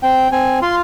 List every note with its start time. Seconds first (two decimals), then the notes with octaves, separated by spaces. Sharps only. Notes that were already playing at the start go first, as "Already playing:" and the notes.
0.03 C4 G5
0.32 C4 G#5
0.62 F4 C6